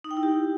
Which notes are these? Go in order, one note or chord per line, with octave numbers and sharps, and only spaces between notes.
D#4
G5
E4
G4